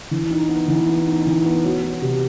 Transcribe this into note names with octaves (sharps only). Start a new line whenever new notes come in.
E3
D#4
B3
E3
B3
D#4
E3
B3
F#3
F#3
C3